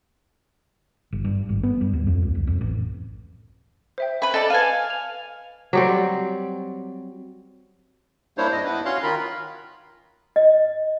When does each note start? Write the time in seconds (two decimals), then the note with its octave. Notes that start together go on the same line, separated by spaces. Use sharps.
1.12 G1
1.24 G2
1.49 G#1
1.63 B3
1.81 G2
1.93 D#2
2.07 F2
2.22 C#2
2.35 C#2
2.47 F2
2.61 A1
3.98 C5 E5 G5
4.22 B4 B5
4.34 A4 D5 D#5
4.50 B4 F5 G#5 A5 D#7
4.90 F7
5.73 F#3 G3 C4
8.38 G3 A#3 D4 E4 C5 C#5
8.52 G2 D4 D#5
8.64 B3 D4 E4 B4
8.85 C#4 F#4 C#5 F5 C6 F#6
9.03 D#3 F4 A#4 B5
10.36 D#5